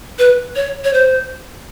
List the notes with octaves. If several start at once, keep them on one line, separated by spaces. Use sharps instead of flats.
B4
C#5
C#5
C5